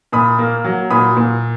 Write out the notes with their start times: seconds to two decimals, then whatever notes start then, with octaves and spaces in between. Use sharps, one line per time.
0.12 A#2 B5 D#6
0.39 A#3
0.64 F#3
0.90 A#2 B5 D#6
1.16 A#2